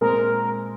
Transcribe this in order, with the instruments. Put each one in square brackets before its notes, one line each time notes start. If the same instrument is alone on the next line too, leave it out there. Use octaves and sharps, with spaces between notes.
[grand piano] A#2 G#3 C4 [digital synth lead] A#4